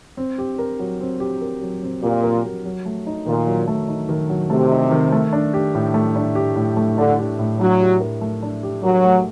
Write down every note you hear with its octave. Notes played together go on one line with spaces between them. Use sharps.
C4
G4
A#4
F#3
C4
G4
A#4
F#3
C4
A#2 G4
A#4
F#3
F#3
A3
D#4
A#2 D#3
F#3
A3
D#4
D#3
F#3
C3 A3
D#4
D#3
A3
D4
G4
A2
A3
D4
G4
A2
A3
D3 D4
G4
A2
F#3 D4
G4
A#4
A3
D4
G4
F#3 A#4
A3